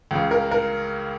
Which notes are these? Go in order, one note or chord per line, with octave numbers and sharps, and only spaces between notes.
C#2 C#3
A#4
A#4